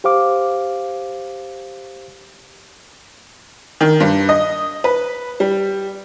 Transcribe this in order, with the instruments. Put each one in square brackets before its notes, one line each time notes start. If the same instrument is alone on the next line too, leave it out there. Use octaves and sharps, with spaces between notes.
[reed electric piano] G4 C5 F5 D6
[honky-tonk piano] D#3
G2
D#5
B4
G3